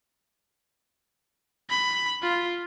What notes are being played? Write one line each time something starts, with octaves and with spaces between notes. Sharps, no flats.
B5
F4